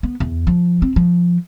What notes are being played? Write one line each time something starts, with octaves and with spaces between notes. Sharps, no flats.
B3
E2
F3
C4
F3